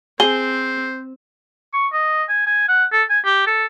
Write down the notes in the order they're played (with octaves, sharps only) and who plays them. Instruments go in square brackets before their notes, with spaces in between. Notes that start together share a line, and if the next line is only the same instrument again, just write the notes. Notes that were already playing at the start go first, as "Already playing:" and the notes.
[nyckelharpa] C4 [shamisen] G#4 [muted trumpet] C5 [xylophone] G7
[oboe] C#6
D#5
G#5
G#5
F#5
A4
G#5
G4
A4